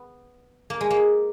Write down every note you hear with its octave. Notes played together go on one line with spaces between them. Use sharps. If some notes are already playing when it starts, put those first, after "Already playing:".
Already playing: B3
A#3
G#3
A#3